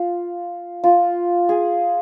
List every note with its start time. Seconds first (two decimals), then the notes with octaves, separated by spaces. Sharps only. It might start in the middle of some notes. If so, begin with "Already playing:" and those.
Already playing: F4
0.84 F4
1.49 G#4